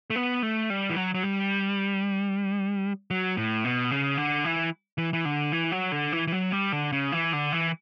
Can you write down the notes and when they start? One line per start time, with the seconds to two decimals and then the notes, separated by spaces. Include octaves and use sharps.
0.10 A3
0.16 B3
0.43 A3
0.70 G3
0.90 E3
0.96 F#3
1.14 F#3
1.23 G3
3.11 F#3
3.37 A2
3.65 B2
3.91 C#3
4.17 D3
4.45 E3
4.98 E3
5.13 E3
5.25 D3
5.52 E3
5.72 F#3
5.92 D3
6.13 E3
6.27 E3
6.32 F#3
6.52 G3
6.72 D3
6.92 C#3
7.12 E3
7.33 D3
7.52 E3